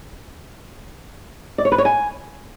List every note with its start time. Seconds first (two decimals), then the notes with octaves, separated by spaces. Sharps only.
1.58 D5
1.65 C#5
1.72 B4
1.78 C#5
1.85 G#5